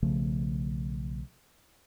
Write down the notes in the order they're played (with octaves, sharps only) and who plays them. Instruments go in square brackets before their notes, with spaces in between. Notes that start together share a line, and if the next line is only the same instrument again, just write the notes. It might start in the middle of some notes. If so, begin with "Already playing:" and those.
[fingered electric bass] B1 C#3 F3 A3